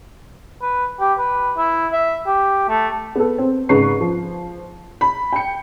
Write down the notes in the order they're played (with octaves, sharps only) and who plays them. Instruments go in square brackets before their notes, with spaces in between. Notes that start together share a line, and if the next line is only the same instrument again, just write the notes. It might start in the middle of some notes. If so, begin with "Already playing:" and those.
[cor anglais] B4
G4
B4
E4
E5
G4
A3
[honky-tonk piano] B3 A4
C4
G#1 G#2 C#3 B4 C#6 C7
F3
B5
G5 C#7